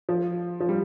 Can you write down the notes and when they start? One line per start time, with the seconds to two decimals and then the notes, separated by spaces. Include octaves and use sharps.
0.09 F3
0.60 F3
0.69 G3